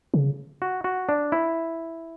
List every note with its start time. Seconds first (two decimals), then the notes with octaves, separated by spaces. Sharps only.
0.14 C#3
0.62 F#4
0.84 F#4
1.09 D4
1.32 E4